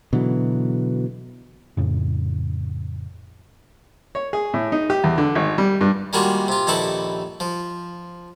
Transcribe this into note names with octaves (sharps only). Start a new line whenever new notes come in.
B2 D3 E3 F#3
F2 A2 C#3
C#5
G#4
A2
D#4
G4
E2
D3
G#1
G3
G2
D#3 G3 G#3 A#3 F4 F#4
C3 F4
A#1 D#2 D#4 E4 A4 B4
F3